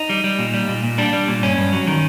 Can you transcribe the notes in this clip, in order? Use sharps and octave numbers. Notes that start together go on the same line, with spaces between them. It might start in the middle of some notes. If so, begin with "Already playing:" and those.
Already playing: D#4
G3
G3
A#2
G3
A#2
A#2
G3 D4
G3
A#2
G2 C#4
G2
F#3
D#3